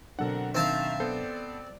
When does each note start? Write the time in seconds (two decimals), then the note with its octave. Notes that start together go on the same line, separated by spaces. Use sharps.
0.19 B2 D3 F#3 C4 D4 A4 A#4 F#5
0.55 D#3 C4 E5 F5 A5
1.00 B3 A4 C5 D5